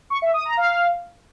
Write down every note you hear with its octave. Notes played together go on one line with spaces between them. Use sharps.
C#6
E5
D#6
A#5
F5